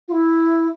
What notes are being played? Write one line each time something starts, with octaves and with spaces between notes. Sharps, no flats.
F4
E4